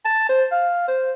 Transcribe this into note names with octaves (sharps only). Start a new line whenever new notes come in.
A5
C5
F5
C5